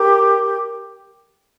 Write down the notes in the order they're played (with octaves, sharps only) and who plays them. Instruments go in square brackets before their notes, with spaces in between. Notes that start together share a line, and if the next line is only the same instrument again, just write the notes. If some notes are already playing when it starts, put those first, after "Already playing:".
Already playing: [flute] G4 [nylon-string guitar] A#4